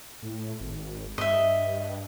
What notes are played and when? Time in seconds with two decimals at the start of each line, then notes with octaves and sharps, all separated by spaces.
0.23 A2
0.60 G#1
1.18 G2 D#5 E5